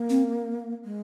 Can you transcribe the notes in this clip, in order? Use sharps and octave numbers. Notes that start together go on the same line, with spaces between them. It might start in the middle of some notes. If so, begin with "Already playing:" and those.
Already playing: A#3
C4
G#3